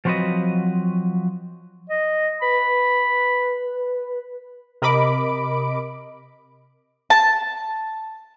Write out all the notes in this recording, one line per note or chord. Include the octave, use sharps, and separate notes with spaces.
F3 F#3 C4 F#4 B4 D#5
D#5
B4 B5
C3 A#4 D#5 B5 D6 D7
A5